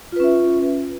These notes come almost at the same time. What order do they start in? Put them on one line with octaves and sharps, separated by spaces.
F4 B4 C#4 E5